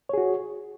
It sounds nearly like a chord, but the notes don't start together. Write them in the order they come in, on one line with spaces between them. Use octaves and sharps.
C#5 G#4 F#4